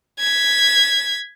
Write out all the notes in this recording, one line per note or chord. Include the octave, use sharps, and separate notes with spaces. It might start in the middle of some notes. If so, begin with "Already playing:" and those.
G#6 B6